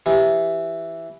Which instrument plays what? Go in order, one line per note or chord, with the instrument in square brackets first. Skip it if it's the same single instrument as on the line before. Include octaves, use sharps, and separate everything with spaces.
[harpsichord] E3 [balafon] G4